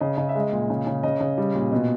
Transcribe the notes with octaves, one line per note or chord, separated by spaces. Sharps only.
C#3 D#5
C#3 D#5
E5
G#3
D#5
A#2
C#3
C#3
C#3 D#5
C#3
G3
A#2
B2 D#5